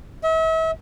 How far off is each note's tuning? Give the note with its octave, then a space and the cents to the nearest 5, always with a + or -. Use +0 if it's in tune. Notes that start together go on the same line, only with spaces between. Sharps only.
E5 -40